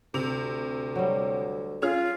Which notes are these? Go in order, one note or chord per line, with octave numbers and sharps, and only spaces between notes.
D2 C3 F7
F#3 G3
C#4 F4 G#4 F6